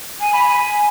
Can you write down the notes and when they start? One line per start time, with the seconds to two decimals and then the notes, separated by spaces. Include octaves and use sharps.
0.20 G#5
0.33 B5
0.45 G#5